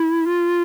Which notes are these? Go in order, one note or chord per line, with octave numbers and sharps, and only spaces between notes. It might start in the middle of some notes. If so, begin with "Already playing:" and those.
Already playing: E4
F4